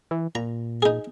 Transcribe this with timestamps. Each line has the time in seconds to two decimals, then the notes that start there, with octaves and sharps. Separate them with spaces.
0.11 E3
0.35 A#2 A#5
0.82 D#4 G#4